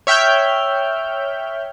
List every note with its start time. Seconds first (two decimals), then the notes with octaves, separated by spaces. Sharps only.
0.07 C#5 E5 G5 F6 G6